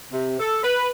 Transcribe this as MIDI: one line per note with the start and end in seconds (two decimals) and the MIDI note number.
0.11 0.35 48
0.40 0.60 69
0.62 0.89 71